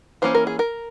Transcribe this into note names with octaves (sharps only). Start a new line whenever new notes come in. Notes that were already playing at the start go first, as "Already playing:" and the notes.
E3 A#3 C#4 C5
A#4
G#4
A#4